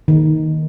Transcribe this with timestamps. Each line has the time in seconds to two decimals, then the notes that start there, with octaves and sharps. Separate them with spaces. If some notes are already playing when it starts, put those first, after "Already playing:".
0.08 D#3